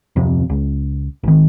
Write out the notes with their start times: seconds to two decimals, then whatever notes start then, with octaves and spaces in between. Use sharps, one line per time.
0.16 D1 F2 C3
0.50 C#2
1.24 G#1 D#3